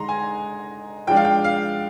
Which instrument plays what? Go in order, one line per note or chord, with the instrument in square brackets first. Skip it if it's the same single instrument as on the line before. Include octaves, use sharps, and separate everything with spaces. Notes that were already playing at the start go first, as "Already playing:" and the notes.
Already playing: [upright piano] D3 G#3 D#4 A#5 C6
G#5
F3 G#3 D4 G5
F5
G5
F5